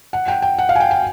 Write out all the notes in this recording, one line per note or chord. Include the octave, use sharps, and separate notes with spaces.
F#5
G5
G5
F#5
F5
G#5
G5
G5